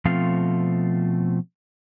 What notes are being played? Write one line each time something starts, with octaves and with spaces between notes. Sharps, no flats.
B2 F3 A3 C4 F4 F5